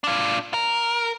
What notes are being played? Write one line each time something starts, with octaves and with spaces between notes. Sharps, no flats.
D4 F4
A#4